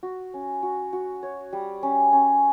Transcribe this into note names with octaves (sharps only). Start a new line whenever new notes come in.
F#4
C#4
F#4
F#4
C#5
G3
C#4
C#4